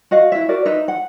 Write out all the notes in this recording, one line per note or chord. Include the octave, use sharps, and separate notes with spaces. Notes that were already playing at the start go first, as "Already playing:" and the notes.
F#4 D#5 F5
E4 E5
F#4 A#4 D5
D#4 B4 E5
F#5